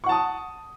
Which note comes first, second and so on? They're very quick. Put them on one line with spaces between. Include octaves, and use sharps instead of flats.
C#6 F#5 A5 D#6